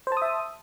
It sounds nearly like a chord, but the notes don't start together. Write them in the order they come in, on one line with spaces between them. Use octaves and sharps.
C5 A5 D#6 E5